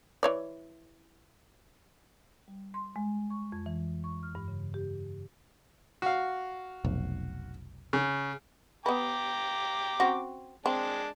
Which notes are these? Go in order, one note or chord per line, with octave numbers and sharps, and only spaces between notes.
E3 C#5 D5
G3
C6
G#3
C#6
F2
E3
C#6
F6
G2
C#3
G4
F#4 F5
F1 B1
C#3
B3 B4 G5 A#5 D6
C4 C#4 F#4
G#3 C4 D4 A5